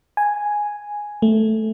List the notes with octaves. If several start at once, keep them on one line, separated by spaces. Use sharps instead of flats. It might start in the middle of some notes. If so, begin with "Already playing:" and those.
G#5
A3